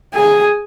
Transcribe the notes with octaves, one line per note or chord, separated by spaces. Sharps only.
G#4